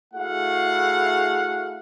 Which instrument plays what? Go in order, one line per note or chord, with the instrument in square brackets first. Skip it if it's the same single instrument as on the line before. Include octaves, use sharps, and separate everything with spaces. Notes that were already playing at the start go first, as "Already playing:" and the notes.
[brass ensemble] A3 E4 F#4 G#4 F5 F#5